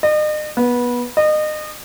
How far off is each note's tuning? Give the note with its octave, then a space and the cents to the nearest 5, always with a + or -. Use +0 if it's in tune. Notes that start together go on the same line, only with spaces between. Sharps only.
D#5 -40
B3 -20
D#5 -30